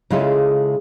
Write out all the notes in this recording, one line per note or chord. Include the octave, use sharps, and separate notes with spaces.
C#3 G#3 E4 F4 G#4 A4